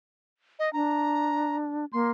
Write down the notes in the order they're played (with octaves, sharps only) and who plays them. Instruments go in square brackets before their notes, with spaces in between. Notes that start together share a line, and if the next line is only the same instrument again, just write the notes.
[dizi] D#5
[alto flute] D4 [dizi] A#5
[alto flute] A#3 [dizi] C6